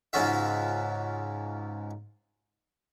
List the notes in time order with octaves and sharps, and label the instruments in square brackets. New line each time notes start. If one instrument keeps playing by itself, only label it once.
[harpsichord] C#2 G#2 C#4 F4 F#4 E5